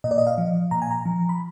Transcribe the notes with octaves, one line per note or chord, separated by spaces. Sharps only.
A#2 D#5
D5
D#5
F5
F3
A#2 A#5
G#5
A#5
F3
B5